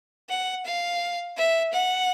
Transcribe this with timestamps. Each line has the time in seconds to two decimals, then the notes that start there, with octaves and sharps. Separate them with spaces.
0.29 F#5
0.66 F5
1.37 E5
1.73 F#5